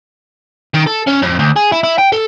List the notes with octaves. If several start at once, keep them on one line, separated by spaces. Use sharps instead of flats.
D#3
A4
C#4
F2
D2
G#4
E4
E4
G5
A4